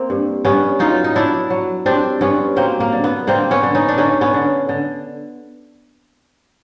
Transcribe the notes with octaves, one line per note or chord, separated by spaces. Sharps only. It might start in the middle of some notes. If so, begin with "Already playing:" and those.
Already playing: A#3 C4
G2
G2 B3 C#4
F#3 D#4 F4
D#4
F#3 D4 E4
F#3
G2 C4 D4
G2 B3 C#4
F#3 A#3 C4
A#3
D3
B3
D3 A#3 C4
B3 C#4
D3
C#4 D#4
D4
D3 C#4 D#4
B3 C#4
D3
D3